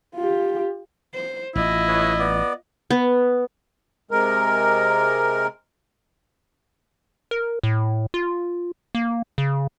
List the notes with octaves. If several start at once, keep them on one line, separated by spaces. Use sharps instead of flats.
F4 G4
C5
A1 E4 F4 D#5
G#4 B4 C#5
B3 D5
B3
C3 G#3 A#4
A#4
A2
F4
A#3
C#3